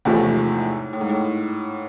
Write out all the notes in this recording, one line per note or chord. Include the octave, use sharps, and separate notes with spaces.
E2 A2 C3 F3 A3
G#2
A2
G#2
A2